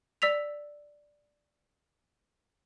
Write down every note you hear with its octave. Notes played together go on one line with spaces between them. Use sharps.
D5 E6 B6 F7